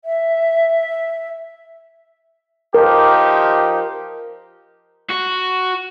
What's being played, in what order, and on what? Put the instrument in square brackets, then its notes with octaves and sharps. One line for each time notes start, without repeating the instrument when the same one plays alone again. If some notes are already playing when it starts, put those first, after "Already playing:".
[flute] E5
[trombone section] F3 D#4 G4 [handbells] A#4
[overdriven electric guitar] F#4